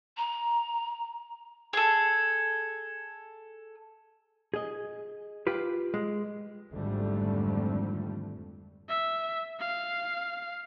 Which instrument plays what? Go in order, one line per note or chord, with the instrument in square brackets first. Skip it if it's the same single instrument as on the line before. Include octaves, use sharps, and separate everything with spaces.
[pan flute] A#5
[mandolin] G#4 A4
[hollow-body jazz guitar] G#4 D#5
F4 G4 B4
G#3
[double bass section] G#1 F2 D3 G3 A3
[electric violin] E5
F5